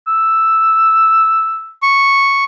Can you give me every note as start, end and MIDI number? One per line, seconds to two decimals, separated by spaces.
0.08 1.74 88
1.83 2.44 85